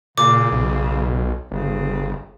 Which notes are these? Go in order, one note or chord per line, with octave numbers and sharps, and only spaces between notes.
A#2 C#3 D6
B1
G1 C#3